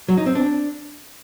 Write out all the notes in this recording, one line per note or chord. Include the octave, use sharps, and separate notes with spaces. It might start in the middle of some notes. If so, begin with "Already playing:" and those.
F#3
D#4
C4
D4